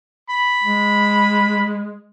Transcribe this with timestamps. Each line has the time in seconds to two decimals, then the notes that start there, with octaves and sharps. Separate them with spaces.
0.30 B5
0.63 G#3